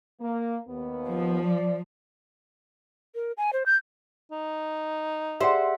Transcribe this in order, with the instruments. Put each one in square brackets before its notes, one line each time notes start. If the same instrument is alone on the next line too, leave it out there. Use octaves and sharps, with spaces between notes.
[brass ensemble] A#3
D#2 B3
[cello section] F3
[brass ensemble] D5
[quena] A#4
G#5
C5
G6
[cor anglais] D#4
[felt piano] G4 G#4 D5 [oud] C5 [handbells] E5 F#5